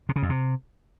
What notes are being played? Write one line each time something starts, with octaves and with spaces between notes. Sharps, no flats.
C3
C#3
F2
C3